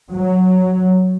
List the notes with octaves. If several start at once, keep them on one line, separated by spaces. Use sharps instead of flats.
F#3